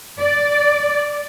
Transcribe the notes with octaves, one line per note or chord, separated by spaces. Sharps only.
D5